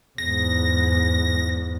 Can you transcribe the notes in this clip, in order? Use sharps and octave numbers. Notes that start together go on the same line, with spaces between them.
E2 G#2 A#6